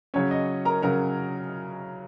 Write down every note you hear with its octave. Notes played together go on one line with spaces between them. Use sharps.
C#3 F#3 C#4 C#5
D#5
A#4 A#5
C#3 F#3 C#4 A#4 A#5